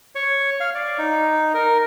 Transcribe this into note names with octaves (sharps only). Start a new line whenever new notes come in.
C#5
F5
D5
D#4
A#4